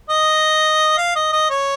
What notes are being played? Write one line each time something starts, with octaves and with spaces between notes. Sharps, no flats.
D#5
F5
D#5
D#5
C#5